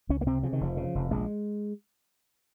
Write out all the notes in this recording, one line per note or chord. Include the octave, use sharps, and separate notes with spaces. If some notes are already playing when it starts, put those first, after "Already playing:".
C#2 C#4
A#3
C3 C4
C#3 F3
D#3
F1 F3
C#3
F1
A#1 G#3